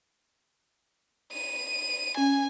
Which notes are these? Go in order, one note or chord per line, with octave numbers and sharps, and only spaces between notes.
D#7
C#4 G#5